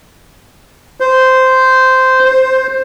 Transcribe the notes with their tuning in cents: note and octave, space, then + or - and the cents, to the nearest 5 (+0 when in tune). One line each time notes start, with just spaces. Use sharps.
C5 -10
C5 +10